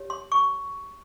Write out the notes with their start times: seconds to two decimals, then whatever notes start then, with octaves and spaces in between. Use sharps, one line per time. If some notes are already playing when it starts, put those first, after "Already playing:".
Already playing: G4 C#5
0.10 C6
0.32 C#6